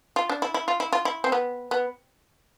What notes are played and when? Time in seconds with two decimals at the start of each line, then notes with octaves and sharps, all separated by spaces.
0.16 F4
0.29 D4
0.42 E4
0.54 E4
0.68 F4
0.80 E4
0.93 F4
1.05 E4
1.24 C4
1.32 B3
1.71 B3